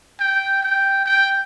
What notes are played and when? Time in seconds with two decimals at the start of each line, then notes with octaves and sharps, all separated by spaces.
0.20 G5
0.63 G5
1.05 G5